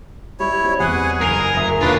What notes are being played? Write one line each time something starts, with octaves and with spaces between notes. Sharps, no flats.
G3 E4 C#5
G3 C4
E2 G#4 F#5 G#5 F#6
F#1 A#4 G#5 C7 F7
D2 E5 D#6
D#2 A#2 D3 D4 F4 F#4 B4